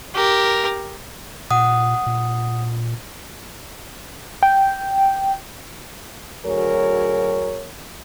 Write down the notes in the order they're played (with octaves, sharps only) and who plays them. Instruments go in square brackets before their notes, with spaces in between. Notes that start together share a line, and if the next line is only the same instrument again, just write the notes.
[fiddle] G4 A#4
[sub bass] A#2 [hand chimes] F#5 D#6
[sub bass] A#2
[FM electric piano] G5
[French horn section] D2 F#3 G#4 A#4 C#5